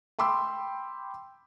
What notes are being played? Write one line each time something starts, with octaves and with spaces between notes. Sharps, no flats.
G5 B5 C6 D6 E6